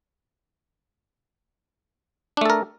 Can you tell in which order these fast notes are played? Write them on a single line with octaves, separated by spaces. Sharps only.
D4 A3 A4 A#4